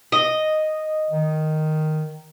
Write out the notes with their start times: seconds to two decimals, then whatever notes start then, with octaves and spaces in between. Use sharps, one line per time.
0.12 D#5
1.10 D#3